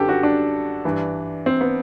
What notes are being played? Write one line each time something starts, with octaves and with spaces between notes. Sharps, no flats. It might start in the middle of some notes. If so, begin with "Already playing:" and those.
Already playing: F#2 D3 G4 A4 B4
F#4
D4
G2 E3
C4
B3